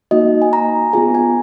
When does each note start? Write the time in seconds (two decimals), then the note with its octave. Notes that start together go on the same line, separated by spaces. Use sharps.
0.11 A#3 D#4 F#4 D#5
0.42 G#5
0.53 A#5
0.93 B3 F4 G#4 G#5
1.15 G#5